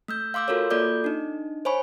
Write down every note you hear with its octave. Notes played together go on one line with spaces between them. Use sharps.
A3 E6 G6
F5 C6 D6 E6 G6
F4 F#4 A4 A#4 C#5
A#3 F4 A4 D5 D6 G6
D4 D#4
C5 C#5 G#5 B5 C#6